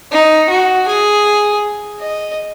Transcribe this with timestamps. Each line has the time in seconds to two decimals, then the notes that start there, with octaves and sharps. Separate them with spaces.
0.12 D#4
0.50 F#4
0.88 G#4
2.00 D#5